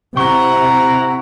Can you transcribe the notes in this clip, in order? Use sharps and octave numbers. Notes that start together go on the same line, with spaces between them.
C3 E4 F#5 A#5 C#6